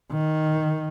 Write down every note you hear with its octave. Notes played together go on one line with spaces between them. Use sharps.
D#3